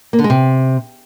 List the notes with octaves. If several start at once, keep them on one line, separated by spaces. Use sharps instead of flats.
A#3
D3
G#3
C3